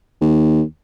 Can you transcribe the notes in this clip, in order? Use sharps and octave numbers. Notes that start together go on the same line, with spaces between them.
D#2